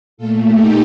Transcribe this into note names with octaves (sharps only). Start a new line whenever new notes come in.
A#2 A3 F4 A4
D#4 G4